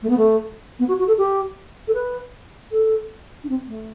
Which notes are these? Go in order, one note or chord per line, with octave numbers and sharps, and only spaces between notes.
A3
B3
A3
B3
F#4
F#4
A4
G4
A4
B4
A4
D4
C4
A3